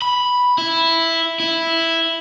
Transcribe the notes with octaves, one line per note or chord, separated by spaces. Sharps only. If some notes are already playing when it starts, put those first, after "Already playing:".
B5
E4
E4